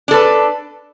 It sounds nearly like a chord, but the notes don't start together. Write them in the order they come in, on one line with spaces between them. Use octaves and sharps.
D4 A4 B4